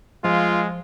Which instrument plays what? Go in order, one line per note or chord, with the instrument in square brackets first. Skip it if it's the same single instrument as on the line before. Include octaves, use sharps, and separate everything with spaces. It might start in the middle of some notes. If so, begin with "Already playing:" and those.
[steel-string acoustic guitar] F3 F5 [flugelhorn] G#3 [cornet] F4